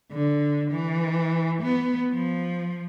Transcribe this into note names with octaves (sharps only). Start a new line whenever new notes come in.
D3
E3
B3
F3